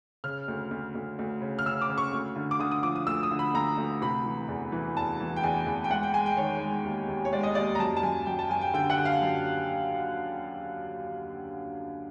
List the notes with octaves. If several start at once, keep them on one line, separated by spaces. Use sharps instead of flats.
C#3 F6
D2
D2
D2
D2
C#3
F6
C#3 E6
D6
C#3
C#6
D2
D3
D6
D3 D#6
D#6
F3 D6
D#6
D2 E6
D#6
D3
B5
D2 A#5
D2
C3 B5
E3
E2
E3
E2 A5
E3
G5
E2 G#5
E2
G5
G#3 F#5
G5
G#3 G#5
G5
D#3 C#5
G#3
D#2
D#2
C#5
G#3 D5
D#5
D#2 D5
A#5
F#2 A5
A5
F#2 G#5
F#2 G5
A5
F#2 G#5
G5
D3 G5
F#5
D3
F5
F#2